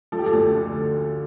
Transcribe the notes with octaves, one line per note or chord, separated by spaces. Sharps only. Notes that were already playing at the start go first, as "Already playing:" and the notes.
F3 A4
G4
A4
D2
D3